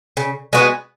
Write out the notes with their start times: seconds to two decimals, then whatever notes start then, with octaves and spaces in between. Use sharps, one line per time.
0.17 C#3
0.53 G#3 B3 F#4